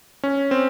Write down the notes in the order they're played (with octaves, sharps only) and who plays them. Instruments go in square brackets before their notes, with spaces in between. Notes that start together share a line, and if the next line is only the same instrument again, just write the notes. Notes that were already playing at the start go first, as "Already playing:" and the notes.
[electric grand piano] C#4
C4